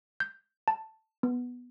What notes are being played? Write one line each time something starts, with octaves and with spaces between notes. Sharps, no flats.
G6
A5
B3